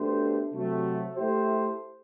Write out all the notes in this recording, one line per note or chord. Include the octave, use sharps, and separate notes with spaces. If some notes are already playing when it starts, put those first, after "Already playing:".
Already playing: B2 A3 D4 G4 C5
C3 F#3 A3
A3 E4 G4 C5